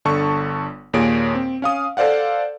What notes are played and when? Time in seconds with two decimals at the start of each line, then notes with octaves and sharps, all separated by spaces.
0.05 G1 D3 A5 C#6
0.93 D#2 A#2 G#4 C#5 D7
1.35 C4
1.62 C#4 F5 D#6
1.97 A4 C5 D5 F5 F#5